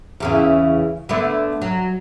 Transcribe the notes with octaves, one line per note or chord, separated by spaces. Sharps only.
E2 C#3 E3
D3 A3 B3
F#3